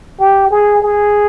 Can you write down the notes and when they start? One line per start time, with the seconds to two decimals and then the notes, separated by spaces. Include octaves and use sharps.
0.20 G4
0.51 G#4
0.82 G#4